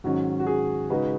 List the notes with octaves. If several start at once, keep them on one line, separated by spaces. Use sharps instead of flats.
G#2 D#3 F#3 C#4 F#4
F#4
G#4
C#3 G#3 D#4 F#4 B4